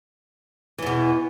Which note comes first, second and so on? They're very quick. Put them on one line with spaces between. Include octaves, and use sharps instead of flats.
E3 E2 B2